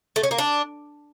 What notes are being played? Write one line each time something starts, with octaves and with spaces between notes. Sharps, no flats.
A3
C#4
A#3
D4